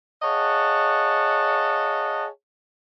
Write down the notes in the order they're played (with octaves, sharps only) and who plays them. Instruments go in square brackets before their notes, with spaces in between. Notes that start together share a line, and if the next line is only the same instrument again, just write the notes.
[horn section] G#4 C#5 D#5 F5 F#5 A5